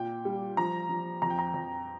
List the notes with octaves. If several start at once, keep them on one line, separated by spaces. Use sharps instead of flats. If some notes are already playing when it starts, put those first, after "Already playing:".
Already playing: A#2 G5
G3
F3 A#5
F3
F2 A#5
G5
A#5
F2